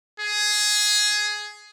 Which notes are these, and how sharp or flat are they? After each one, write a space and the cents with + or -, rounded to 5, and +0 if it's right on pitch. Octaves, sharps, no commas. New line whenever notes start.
G#4 +10